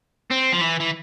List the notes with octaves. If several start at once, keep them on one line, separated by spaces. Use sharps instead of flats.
C4
F3
E3
E3